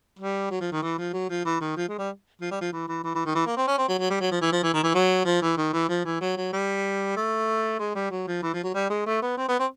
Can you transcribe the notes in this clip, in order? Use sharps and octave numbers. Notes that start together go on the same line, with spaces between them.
G3
F#3
F3
D#3
E3
F3
F#3
F3
E3
D#3
F3
G#3
G3
F3
G3
F3
E3
E3
E3
E3
D#3
E3
A#3
C4
C#4
C4
F#3
F#3
G3
F#3
F3
E3
F3
E3
D#3
E3
F#3
F3
E3
D#3
E3
F3
E3
F#3
F#3
G3
A3
G#3
G3
F#3
F3
E3
F3
F#3
G3
G#3
A3
B3
C4
B3
C4